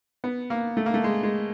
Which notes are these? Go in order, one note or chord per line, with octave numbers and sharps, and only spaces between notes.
B3
A#3
A3
A#3
A3
G#3
G#3